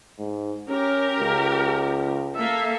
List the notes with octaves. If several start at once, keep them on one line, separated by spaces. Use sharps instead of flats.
G#2
C#4 G4 A#4
C#2
A#3 A4 E5